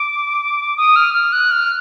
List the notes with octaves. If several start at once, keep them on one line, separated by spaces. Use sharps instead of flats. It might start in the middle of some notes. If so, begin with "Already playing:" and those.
Already playing: D6
D#6
F6
F6
F#6
F6